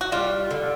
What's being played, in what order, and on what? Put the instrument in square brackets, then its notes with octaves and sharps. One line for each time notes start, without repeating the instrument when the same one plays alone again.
[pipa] F#4
[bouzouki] G3 [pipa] F4
[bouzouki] D3